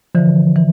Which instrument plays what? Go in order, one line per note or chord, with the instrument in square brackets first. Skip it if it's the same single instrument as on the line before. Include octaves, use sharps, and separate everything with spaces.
[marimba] D3 E3 [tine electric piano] F3
[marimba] E3